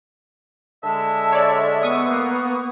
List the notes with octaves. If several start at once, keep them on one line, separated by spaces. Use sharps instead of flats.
D3 G#3 E5 A5
C#5 D5
B3 C#6 D#6
A#3